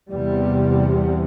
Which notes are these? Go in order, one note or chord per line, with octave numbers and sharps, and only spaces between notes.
E2 C3 G3